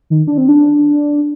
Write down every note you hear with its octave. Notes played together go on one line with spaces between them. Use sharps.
D#3
D4
C4
D4